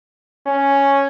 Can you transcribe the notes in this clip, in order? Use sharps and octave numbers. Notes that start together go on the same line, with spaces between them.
C#4